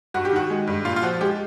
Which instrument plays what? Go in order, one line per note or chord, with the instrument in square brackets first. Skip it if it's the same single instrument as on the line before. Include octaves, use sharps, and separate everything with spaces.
[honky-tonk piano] G2 F#4
G4
D#3 F#4
G#3
G2
A#2 F4
F4
F3 F#4
G#3 G4